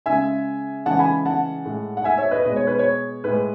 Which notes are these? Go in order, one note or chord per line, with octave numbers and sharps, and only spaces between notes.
C#3 G#3 E5 G#5
C#3 E3 G#3 F#5 A5
G#5 B5
F#5 A5
A2 G#3
F#5
E5 G#5
C#5 E5
B4 D#5
B2 G#3 D#5
C#5
B4
C#5
A2 G#3 B4